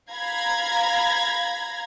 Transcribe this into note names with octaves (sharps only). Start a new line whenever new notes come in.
F5 A#5 B5 G#6 A#6